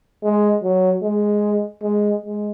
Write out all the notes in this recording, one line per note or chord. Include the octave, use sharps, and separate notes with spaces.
G#3
F#3
G#3
G#3
G#3